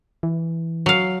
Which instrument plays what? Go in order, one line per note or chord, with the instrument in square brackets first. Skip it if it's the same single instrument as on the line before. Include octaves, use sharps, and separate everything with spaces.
[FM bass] E3
[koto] F#3 F5